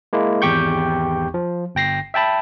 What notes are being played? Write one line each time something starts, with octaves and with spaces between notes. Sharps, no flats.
G#3 A#3 E4
G#1 E2 G4 G5 C#6 G6
F3
G1 G5 A#6 C7
E5 G5 A5 B5